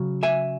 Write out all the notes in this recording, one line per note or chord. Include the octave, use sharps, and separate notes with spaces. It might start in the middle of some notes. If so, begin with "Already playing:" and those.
Already playing: C#3 F#3
E5 G#5